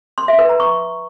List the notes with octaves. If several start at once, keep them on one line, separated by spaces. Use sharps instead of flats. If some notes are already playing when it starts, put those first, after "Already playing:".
C6
E5
B4
A#5
C#6